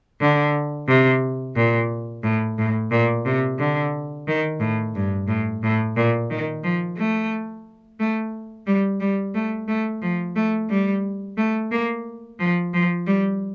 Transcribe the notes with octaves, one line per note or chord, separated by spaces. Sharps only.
D3
C3
A#2
A2
A2
A#2
C3
D3
D#3
A2
G2
A2
A2
A#2
D#3
F3
A3
A3
G3
G3
A3
A3
F3
A3
G3
A3
A#3
F3
F3
G3